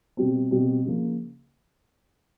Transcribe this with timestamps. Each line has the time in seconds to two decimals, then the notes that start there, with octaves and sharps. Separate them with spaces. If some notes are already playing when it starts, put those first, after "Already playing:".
0.17 B2 G3 C4
0.51 B2 G3 C4
0.85 C#3 F3 A#3